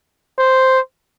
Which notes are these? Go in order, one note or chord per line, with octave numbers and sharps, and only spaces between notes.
C5